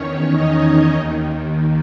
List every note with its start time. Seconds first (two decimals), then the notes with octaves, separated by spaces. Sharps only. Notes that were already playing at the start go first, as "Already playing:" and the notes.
Already playing: E2 D#3 C#4 C#5
0.33 D#4 D#5
0.64 C#4 C#5
0.94 D#2 D#3